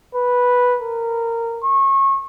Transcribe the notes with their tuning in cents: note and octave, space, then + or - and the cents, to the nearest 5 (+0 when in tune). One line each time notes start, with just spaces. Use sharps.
B4 -5
A#4 -15
C#6 -25